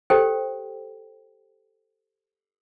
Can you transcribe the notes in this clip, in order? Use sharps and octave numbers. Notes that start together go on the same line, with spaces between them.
G4 A4 C5 G5